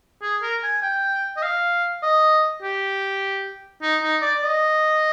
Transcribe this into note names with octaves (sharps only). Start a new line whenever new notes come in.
G#4
A#4
G#5
G5
D#5
F5
D#5
G4
D#4
D#4
D5
D#5